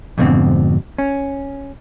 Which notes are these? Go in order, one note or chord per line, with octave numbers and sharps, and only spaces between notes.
F2 G#2 B2 D3 C4
C#4